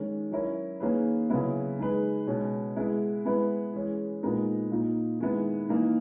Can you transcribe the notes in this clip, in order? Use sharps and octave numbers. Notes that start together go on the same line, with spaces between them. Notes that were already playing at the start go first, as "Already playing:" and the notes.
Already playing: D#3 G#3 C#4
F#3 C#4 E4 A#4
D#3 A#3 C#4 G#4 B4
C#3 F#3 B3 E4
G#3 D#4 G#4 B4
B2 G#3 C#4
G#3 B3 E4 G#4
G#3 B3 E4 B4
E3 G#3 C#4 G#4
A#2 G#3 B3 D#4 A#4
A#2 A#3 D#4
D#3 G#3 B3 E4
E3 A#3 D#4